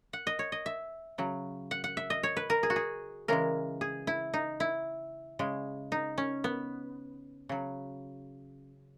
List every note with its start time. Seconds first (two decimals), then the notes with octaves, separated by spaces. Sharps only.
0.13 F#5
0.27 D#5
0.39 C#5
0.52 D#5
0.66 E5
1.18 C#3 F#3
1.71 F#5
1.84 F#5
1.97 E5
2.10 D#5
2.23 C#5
2.37 B4
2.50 A#4
2.63 G#4
2.70 F#4
2.76 G#4
3.28 C#3 E3 G#3 A#4
3.81 G#4
4.07 E4
4.34 D#4
4.60 E4
5.39 C#3 G#3
5.92 D#4
6.18 C#4
6.44 B3
7.49 C#3 F#3